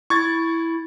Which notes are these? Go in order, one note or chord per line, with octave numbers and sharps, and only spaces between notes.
E4 C#6 G#6 A6